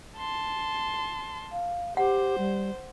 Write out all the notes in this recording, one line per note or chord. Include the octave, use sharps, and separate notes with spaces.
A5 C6
F5
G4 C5 F#5
G3